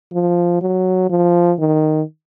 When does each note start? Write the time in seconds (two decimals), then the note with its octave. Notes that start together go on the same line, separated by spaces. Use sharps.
0.13 F3
0.61 F#3
1.10 F3
1.58 D#3